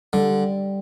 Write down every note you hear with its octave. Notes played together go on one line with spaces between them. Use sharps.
D3 G3